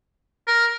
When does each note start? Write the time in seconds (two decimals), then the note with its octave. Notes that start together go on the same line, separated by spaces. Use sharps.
0.47 A#4